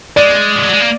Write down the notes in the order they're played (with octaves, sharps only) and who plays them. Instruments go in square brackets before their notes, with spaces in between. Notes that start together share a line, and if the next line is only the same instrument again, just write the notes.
[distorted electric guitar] G#3 [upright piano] D5
[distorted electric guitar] F3
F#3
G#3
A#3